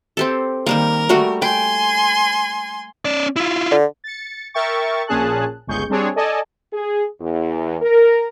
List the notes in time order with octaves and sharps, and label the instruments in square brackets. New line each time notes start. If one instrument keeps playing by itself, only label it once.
[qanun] C4 G4 A4
[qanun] D#3 G3 A#3 [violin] A#4
[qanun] G3 A3 F#4
[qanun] G5 [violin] G#5 C6
[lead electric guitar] C#4 D5
E4 F4
[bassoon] D3
[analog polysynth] A6 C#7
A#4 E5 G5 C#6 A6
A#1 A#2 C#4 G#4 A5 F#6
G1 C#2 G#4 C#6 G6
G3 C4 D4 G#4 C#5
A4 D5 D#5 G#5 A5
[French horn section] G#4
E2
A#4